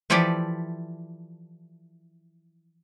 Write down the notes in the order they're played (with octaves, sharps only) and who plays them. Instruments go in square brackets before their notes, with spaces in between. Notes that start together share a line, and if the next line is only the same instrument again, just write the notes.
[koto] E3 F3 E4 G4 A4 D5